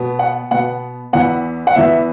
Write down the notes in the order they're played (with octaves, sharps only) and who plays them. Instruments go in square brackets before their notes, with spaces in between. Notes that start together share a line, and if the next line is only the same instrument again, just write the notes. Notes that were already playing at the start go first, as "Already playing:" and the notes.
Already playing: [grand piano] B2 B3
F#5
B2 B3 F#5
E2 E3 B3 F#5
F#5
E2 E3 B3 E5